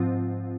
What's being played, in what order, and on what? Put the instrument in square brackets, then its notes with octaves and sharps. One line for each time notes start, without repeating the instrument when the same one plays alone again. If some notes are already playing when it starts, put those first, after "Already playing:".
Already playing: [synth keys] G#2 F3 C4 F4